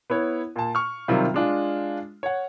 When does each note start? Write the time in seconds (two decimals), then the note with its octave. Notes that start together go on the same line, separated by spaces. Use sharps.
0.10 B3 E4 C#5
0.56 A#2 A5
0.75 C#6 F6
1.08 C3 D#3 F#3 G3 F4
1.34 G#3 D4 F4
2.23 C#5 F#5